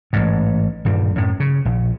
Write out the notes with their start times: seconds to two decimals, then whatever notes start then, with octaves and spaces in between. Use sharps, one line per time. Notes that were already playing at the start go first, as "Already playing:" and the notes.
0.13 A1 G#2
0.85 D#1 G2 G3
1.16 F#2 A2
1.40 C#3
1.65 A#1